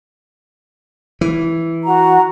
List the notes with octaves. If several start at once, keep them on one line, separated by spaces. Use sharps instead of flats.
E3
F#4 F#5 A#5